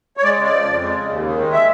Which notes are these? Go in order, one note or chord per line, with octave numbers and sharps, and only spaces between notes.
C#5
G#3 D5
C#3
D5
F3
F2
G#3
C#3
D#2
D#3
G#3
E5